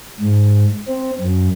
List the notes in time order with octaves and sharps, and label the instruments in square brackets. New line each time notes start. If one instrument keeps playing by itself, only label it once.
[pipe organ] G#2
C4
F#2